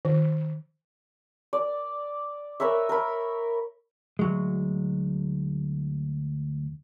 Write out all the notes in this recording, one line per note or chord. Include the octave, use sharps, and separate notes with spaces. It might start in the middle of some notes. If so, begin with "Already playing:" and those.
D#3
D5
A#4 B4 C#5 E5
A#4 B5
D2 F#3 G#3